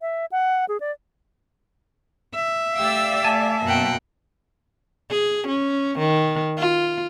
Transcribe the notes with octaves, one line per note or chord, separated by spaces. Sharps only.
E5
F#5
G#4
D5
E5
A3 G4 D5 F5 E6
A3 G#5 A5
F#2 B2 A#3 F#5 G5
G#4
C#4
D#3
F4